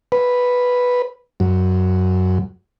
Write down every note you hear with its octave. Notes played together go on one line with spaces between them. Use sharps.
B4
F#2